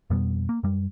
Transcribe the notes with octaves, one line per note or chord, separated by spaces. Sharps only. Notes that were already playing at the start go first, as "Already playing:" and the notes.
F2 B2 G3 B3
A#3
F#2 G3